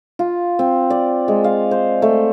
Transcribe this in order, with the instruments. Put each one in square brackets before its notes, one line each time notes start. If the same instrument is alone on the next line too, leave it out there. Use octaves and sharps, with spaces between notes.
[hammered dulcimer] F4
C4
D5
G#3
F5
C5
A3